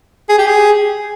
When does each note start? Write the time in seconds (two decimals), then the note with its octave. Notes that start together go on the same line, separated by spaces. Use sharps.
0.29 G#4
0.38 G4
0.47 G#4